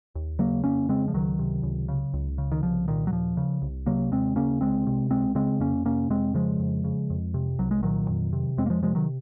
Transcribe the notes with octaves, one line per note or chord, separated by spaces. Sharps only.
D#2
C#3 F#3 A#3
F2 A#3 C#4
C#3 G#3 C4
F3
C#2 D#3 F#3
C3
C#2
C#3
C#2
C#3
D#3
C2 F3
A#2 D#3
F#3
D#2 F3
C#3
C2
C3 F#3 A#3
D#2 G#3 C4
C#3 A#3 C#4
C2 G#3 C4
C3
C#2 G#3 C4
C#3 G#3 C4
F2 A#3 C#4
C3 A#3 C#4
F2 G#3 C4
C#3 F3 G#3
F2
C#3
F2
C3
C2 F#3
G#3
A#2 D#3 F#3
F2
C3
F2 G#3 C4
A#3
F3 G#3
C3 F3 G#3
D#3 F#3